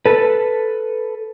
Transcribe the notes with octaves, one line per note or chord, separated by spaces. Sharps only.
A4 B4